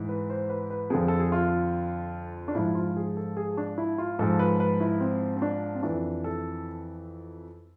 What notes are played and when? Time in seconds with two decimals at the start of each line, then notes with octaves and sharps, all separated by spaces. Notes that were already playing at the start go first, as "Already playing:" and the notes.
Already playing: G#2 E3
0.09 B4
0.30 C5
0.50 B4
0.70 B4
0.90 F2 D3 F3 G#4
1.08 A4
1.20 G#4
1.32 F4
2.48 D4
2.55 G#2 F3 E4
2.75 F4
2.96 G#4
3.17 A4
3.37 G#4
3.57 D4
3.78 E4
3.98 F4
4.19 G#2 F3 A4
4.39 B4
4.60 B4
4.81 E4
5.01 C4
5.37 C4
5.42 D4
5.75 C4
5.83 F2 E3 D4
6.24 A4